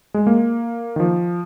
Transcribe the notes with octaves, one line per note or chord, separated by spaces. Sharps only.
G#3
A#3
D#3
F3